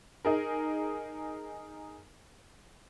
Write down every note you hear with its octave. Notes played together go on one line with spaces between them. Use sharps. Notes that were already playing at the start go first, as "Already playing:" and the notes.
D#4 G#4 A#4